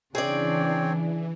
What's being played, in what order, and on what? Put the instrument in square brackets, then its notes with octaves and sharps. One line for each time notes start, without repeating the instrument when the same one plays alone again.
[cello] C#3 D4 [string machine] E3 [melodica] C4 C#5 G5 [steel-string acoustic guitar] G#4 D5